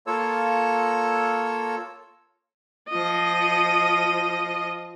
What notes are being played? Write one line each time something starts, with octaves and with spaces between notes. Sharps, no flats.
A#3 F4 A4 C#5 E6
F3 D#5